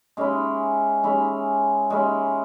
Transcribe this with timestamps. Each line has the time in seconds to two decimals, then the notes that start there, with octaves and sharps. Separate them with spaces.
0.17 G#3 C#4 E4
1.04 G#3 C#4 E4
1.90 G#3 C#4 E4